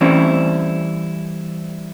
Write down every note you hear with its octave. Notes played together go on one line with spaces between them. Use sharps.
E3 G3 A3 C4 C#4 E4